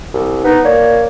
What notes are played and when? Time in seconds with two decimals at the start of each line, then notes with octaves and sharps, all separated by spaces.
0.14 C2
0.44 B3 D#4
0.65 A#3 C#5 D5